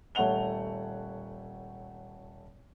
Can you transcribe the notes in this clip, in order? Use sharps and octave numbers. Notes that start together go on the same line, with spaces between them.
D#1 A3 C#5 F#5 F7 G7